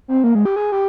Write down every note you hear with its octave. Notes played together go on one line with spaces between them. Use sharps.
C4
A#3
G#3
G4
G#4
G4